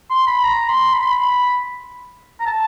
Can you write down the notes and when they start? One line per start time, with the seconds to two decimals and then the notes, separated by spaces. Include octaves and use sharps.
0.10 C6
0.27 B5
0.44 A#5
0.69 C6
0.94 B5
1.03 C6
1.11 B5
2.40 A#5
2.46 A5